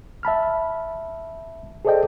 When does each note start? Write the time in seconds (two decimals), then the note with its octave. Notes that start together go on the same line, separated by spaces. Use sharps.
0.23 E5 A5 B5 F6
1.85 G#4 A4 C5 D5 D#5 G5